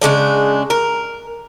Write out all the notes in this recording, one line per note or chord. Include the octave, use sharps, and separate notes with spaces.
C#3 F3 G#3 D4
A#4